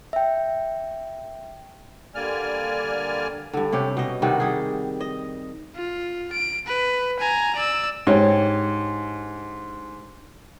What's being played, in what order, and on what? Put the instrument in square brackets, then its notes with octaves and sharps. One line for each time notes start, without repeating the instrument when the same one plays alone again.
[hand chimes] E5 G5
[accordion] D3 G3 A#3 D5 G#5 F6
[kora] G2 D3
C3 C#4 G4
B2 D#5
C3 D#3 G3 F#4
G3 G#4
D#5
[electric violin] F4
D7
B4
G#5 A#5
D5 E6
[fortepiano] G#2 [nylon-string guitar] D4 G4 C#5